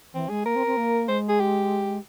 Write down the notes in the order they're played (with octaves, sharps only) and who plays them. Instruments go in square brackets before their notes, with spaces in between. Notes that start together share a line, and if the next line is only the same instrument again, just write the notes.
[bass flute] E3 [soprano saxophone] C4
[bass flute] G#3 [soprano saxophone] G#4
[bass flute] A#3 [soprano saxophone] A#4
[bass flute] C4
C4
A#3
[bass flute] G#3 [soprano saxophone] C5
[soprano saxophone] G#4
G4